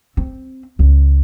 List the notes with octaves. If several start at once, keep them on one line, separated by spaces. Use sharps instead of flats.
C4
C#2